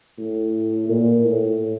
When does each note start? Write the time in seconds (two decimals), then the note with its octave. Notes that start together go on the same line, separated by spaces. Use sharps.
0.18 A2
0.89 A#2
1.25 A2